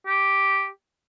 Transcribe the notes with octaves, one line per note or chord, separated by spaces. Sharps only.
G4